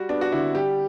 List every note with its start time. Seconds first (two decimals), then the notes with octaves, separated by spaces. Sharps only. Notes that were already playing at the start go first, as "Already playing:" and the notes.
Already playing: G3 F#4
0.09 B3 D4
0.21 F#4
0.32 D3 E4
0.55 G3 G4